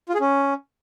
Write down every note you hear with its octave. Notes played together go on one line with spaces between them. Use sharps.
F4
G#4
C#4